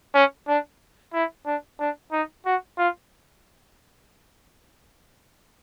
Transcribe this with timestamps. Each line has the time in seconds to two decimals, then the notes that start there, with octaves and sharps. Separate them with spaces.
0.14 C#4
0.48 D4
1.14 E4
1.46 D4
1.80 D4
2.12 D#4
2.46 F#4
2.78 F4